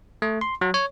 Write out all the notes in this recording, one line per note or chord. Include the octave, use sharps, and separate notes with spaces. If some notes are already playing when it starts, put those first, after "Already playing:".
A3
C6
F#3
C#5